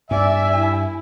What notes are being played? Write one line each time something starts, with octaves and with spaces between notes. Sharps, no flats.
G2 D5 E5 G#5
E4